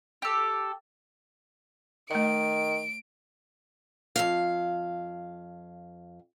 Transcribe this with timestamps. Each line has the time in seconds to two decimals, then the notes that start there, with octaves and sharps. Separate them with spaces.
0.22 G4 A4
2.11 D#3 A3 D#5 D7
4.16 F2 C#3 F5